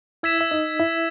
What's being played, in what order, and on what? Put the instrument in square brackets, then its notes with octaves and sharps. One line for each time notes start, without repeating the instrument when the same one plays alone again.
[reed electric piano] E4 E5 [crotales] E6 G#6 B6 E7
[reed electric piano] E5
D#4 D#5
E4 E5